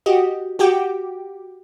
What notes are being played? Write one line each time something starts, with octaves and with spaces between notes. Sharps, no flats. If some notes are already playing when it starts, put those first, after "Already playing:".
F#4 G4 D#5
F#4 G4 G5 D6